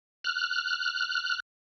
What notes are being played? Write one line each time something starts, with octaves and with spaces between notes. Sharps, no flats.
F6 F#6